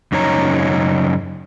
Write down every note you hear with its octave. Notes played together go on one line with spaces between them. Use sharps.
F#2 C#3 D#4 C#5 A#5